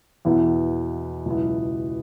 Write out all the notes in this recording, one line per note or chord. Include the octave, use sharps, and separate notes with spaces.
E2 B2 B3 E4
C#2 B2 F#3 B3 E4